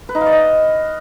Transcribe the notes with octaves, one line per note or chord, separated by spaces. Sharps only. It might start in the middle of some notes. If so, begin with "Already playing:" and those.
B4
D#4
F5
D5
D#5